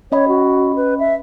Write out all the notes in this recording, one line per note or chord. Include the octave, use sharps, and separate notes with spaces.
C#4 C#5 D#5 B5
F#4
B4
E5